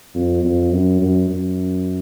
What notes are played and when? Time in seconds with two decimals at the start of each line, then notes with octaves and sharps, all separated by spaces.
0.14 F2
0.43 F2
0.72 F#2
1.02 F#2
1.30 F#2